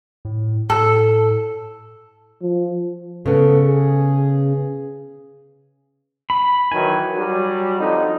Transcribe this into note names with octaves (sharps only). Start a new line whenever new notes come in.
A2
A2 A4
F3
C#3 B3 A4
G#4
B5
D#3 E3 F#3 G#5
F#3 G3
F2 D3 D#4